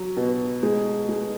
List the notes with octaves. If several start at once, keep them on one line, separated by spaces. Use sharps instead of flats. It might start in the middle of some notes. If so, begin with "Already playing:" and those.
Already playing: F#3
B2
G#3
G#3